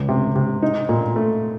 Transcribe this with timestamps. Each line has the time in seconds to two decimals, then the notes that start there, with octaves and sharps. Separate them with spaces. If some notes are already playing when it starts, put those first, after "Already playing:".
Already playing: C#2
0.09 C3
0.36 C3
0.62 D#4
0.89 A#2
1.16 A3